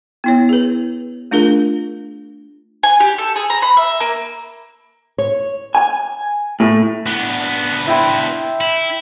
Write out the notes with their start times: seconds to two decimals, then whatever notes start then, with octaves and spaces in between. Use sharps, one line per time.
0.24 B3 E4 C#5
0.49 G#4 B4
1.31 A3 D4 F4 G#4 A#4
2.83 G#5
3.00 G4
3.18 A4
3.36 G#4
3.50 A#5
3.62 B5
3.77 E5
4.00 A#3
5.18 C#5
5.75 G#5
6.60 A2
7.06 B3 D4
7.87 E4 G5 C6
8.61 E4